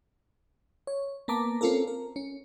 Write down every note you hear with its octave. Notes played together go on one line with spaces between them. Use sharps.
C#5
A#3 B3 A5 A#5 D6
C4 C#4 F4 A4 A#4
A#4
C#4